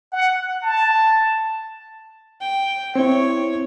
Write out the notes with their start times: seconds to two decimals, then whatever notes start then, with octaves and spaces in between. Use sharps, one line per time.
0.13 F#5
0.62 A5
2.41 G5
2.96 C4 E4 C#5